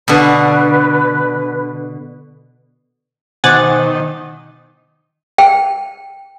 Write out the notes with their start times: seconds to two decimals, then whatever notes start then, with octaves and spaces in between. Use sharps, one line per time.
0.08 B2 D3 B4
3.44 B2 D#3 C5 F#5 G#5 D6 A6
5.38 G5